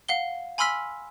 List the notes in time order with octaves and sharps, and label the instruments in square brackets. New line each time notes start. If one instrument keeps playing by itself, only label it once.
[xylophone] F5 F#5 G7
G#5 B5 C6 E6 F6 B6